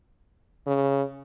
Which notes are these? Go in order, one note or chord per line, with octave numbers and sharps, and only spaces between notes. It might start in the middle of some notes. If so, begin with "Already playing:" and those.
C#3